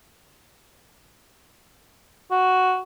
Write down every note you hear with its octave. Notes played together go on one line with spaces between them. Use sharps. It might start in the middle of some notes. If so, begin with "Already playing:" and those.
F#4